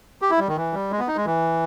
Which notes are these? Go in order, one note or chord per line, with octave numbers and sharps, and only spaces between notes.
G4
E4
G3
D#3
E3
G3
G#3
B3
D#4
G#3
E3